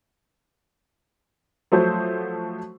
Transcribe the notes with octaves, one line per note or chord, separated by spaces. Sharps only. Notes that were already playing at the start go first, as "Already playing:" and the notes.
F3 F#3 A3 F#4 C5